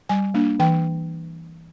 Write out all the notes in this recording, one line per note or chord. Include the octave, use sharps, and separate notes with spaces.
G3 G#5
A#3 D4
E3 G5